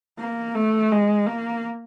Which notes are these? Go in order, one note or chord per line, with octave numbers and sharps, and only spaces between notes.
A#3
A3
G#3
A#3